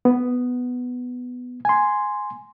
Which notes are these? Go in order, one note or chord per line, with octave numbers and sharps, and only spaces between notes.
B3
G#5 C6